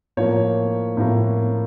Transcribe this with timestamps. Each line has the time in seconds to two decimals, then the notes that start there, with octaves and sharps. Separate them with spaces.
0.17 A2 F3 A#3 C#5
0.97 A2 F3 A#3